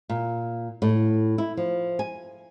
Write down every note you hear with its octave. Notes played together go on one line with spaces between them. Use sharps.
A#2
A2
E4
F3
G#5